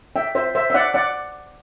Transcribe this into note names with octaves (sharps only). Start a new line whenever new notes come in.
E5 G5
C5 E5
C5 E5
E5
D5 F#5
D5 F#5